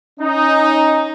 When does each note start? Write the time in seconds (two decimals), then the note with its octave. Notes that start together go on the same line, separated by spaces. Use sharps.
0.20 C#4 D#4